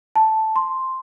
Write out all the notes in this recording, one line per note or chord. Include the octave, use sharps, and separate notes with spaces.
A5
C6